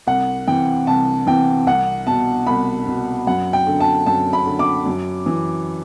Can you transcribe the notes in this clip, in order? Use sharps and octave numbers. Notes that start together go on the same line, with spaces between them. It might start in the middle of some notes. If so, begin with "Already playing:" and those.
C2 F#5
C3 E3 G5
C2 A5
C3 E3 G5
C2 F#5
B2 A5
C2 B5
B2
F#2 F#5
G5
D3
A5
F#2 A5
B5
D3
D6
F#2
E3